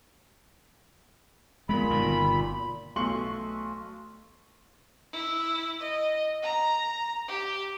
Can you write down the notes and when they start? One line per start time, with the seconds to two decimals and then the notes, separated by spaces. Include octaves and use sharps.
1.69 A#2 G#3 B3 B5
1.90 G1 B2 D#3
2.96 B1 A3 C6 C#6 F#7
5.13 E4
5.79 D#5
6.42 A#5
7.28 G4